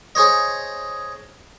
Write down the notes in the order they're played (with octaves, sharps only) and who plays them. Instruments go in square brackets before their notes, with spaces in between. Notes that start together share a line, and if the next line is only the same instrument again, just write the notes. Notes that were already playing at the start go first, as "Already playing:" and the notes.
[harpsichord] G#4 C5 C#5 D#5